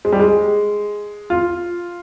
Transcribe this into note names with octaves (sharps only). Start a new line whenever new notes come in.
G#3
G3
G#3
F4